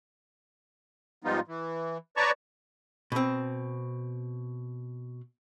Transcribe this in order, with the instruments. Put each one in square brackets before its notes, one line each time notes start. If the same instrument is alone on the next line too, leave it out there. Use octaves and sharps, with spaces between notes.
[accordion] G#2 F3 G3 B3 D#4 F4
E3
B4 C#5 D5 A5 A#5 C#6
[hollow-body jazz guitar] B2 C4